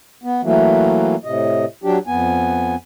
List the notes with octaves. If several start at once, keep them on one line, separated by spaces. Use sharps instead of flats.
B3
E3 F#3 A3 A#3
A2 C3 D#5
F#3 D4 G4
F2 B3 G#5